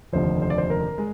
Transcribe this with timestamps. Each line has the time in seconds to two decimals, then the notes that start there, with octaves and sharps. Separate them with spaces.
0.13 F1 D#2 D3 F3 C5
0.42 C5
0.50 D5
0.58 C5
0.70 A#4
0.98 G#3